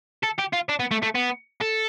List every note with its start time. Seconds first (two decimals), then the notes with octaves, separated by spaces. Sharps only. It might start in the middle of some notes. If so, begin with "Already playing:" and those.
0.23 A4
0.38 G4
0.53 F4
0.69 D4
0.80 B3
0.91 A3
1.03 A3
1.15 B3
1.61 A4